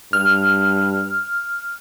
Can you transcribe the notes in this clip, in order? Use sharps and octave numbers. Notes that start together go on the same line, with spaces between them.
G2 F6